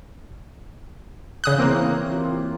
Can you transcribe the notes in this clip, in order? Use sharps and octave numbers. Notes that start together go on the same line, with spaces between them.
C#3 D#6 F#6
E3 A#3 C4 E4 C#5
F4 G4